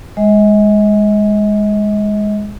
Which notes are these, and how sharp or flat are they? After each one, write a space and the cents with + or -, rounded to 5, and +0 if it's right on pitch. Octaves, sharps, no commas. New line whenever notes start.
G#3 -5 D#5 +40